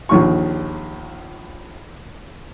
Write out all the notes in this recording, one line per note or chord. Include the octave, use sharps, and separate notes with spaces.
A#1 D#2 C#6